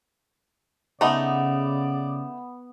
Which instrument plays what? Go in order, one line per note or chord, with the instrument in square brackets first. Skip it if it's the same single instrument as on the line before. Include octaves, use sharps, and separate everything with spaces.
[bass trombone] C#3 [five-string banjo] A3 D#4 [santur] B3 [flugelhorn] D5